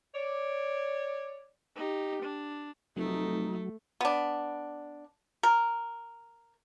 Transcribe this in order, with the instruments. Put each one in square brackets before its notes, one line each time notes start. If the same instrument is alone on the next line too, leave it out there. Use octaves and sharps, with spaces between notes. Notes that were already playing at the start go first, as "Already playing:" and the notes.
[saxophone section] C#5 D5
[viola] D#4 G4
D4
[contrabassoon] F1 [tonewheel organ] F#3 [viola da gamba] A3 [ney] D#4
[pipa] B3 D4
A#4